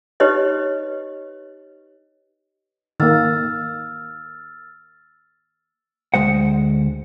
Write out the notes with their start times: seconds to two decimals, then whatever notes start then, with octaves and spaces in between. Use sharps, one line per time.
0.20 D#4 G4 B4 C#5 D#5
3.00 D#3 A#3 E6 F6 A6
6.14 D2 G#3 C5 F#5